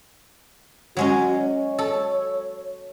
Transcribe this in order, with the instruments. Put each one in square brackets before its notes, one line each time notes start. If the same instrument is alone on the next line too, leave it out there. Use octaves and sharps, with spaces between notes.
[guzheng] F#3 G#3 C#4 [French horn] F#4
[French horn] C#5
[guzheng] A4